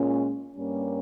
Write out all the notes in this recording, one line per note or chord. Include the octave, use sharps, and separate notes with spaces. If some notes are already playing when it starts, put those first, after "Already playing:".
Already playing: A#2 G#3 C#4
G2 G3 A#3 C#4